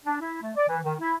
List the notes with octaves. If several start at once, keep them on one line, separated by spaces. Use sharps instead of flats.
D4
E4
A3
D5
E3
D#3
E4